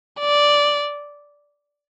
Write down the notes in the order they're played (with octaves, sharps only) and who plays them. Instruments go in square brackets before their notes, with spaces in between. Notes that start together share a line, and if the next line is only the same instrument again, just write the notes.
[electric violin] D5